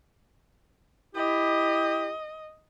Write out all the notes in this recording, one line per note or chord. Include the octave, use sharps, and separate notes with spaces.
E4 G4 D#5